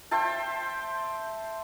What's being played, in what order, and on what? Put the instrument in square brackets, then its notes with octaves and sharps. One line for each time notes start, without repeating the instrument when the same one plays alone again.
[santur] C5 E5 G5 A5